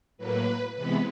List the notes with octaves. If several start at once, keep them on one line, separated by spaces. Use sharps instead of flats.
A2 F#3 A#3 B4
C3 E3 G#3 B3 B4